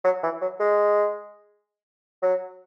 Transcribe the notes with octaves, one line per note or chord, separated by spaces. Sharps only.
F#3
E3
F#3
G#3
F#3